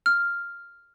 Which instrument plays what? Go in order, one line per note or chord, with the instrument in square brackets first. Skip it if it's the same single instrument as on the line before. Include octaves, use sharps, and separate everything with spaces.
[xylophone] F6